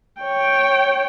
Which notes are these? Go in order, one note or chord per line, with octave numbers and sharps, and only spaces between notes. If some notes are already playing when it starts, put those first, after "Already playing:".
C#5 G5